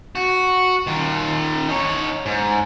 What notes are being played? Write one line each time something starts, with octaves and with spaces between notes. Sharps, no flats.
F#4
D#3 F4
D#4 C#5
G#2